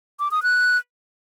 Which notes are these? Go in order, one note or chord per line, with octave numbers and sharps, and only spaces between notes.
D6
D#6
F#6